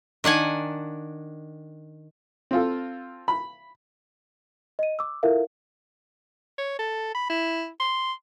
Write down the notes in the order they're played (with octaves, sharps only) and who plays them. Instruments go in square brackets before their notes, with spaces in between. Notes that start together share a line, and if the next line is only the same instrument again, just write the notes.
[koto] D#3 D4 F#5 G#5
[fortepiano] C4 F4 A4
B5
[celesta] D#5 D#7
D6 E6
E4 F4 A4 A#4 E5 F5
[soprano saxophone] C#5
A4
B5
E4
C6